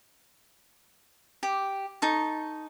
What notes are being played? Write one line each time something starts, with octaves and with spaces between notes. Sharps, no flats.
G4
D#4 A4 C#6